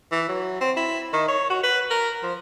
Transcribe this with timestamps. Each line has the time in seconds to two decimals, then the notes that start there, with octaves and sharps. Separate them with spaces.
0.12 E3
0.29 F#3
0.60 C4
0.77 E4
1.13 D#3
1.28 C#5
1.50 F#4
1.63 B4
1.90 A#4
2.23 F3